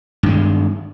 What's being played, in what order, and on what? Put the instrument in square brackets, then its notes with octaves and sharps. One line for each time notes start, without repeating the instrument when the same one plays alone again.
[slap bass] G2
D#3
G#3